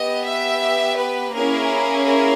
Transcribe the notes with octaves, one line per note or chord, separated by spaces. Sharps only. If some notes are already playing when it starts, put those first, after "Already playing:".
Already playing: B3 G4 D#5
E5
B4
A#3 C#4 E4 G#4 A#4
A#4